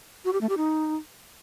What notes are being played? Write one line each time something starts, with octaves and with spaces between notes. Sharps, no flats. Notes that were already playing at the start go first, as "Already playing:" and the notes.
F#4
G4
A3
G4
D#4